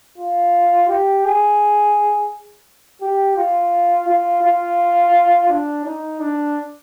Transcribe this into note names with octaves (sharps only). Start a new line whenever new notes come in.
F4
G4
G#4
G4
F4
F4
F4
D4
D#4
D4